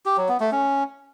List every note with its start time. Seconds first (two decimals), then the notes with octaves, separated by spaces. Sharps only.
0.05 G4
0.17 F#3
0.29 B3
0.40 A3
0.52 C#4